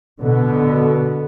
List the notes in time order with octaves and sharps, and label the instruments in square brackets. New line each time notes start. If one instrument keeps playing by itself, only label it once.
[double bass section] B2 D3 B3